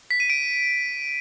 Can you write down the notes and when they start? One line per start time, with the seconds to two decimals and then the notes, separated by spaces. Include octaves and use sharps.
0.11 B6
0.20 D#7
0.30 D7